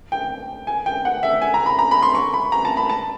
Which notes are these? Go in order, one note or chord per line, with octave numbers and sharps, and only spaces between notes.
G5
G#5
G5
F#5
E5
G#5
A#5
B5
A#5
B5
C6
C#6
B5
A#5
A5
B5
A5